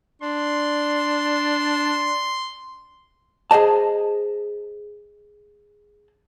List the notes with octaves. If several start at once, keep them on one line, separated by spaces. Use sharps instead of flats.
D4 C6
G#4 C5 D#5 A5